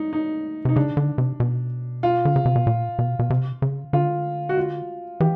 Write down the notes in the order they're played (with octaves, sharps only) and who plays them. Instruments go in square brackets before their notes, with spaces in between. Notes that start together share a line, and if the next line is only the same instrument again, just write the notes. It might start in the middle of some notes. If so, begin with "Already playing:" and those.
Already playing: [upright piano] D#4
D#4
[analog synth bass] C3 [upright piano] D#4
[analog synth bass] C#3 [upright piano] D4
[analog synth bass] D3
C3
B2
[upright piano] F4
[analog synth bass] D3
C#3
C3
B2
A#2
B2
B2
C3
C#3
[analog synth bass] D3 [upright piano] F4
[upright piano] F#4
F4
[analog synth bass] E3 [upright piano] G4